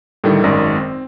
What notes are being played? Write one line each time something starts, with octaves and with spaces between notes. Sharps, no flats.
A2 D3 D#3 G3 A3
G#1 F#2 D#3 D5 A#6
C4